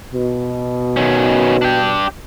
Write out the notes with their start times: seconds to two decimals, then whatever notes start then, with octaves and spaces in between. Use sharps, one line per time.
0.13 B2
0.97 D#3 C#4
1.62 D4 G4